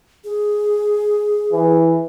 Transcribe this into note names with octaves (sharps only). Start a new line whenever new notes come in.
G#4
E3